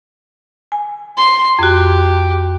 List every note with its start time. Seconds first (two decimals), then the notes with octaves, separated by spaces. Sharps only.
0.72 G#5
1.18 C6
1.59 F2 F#4 G4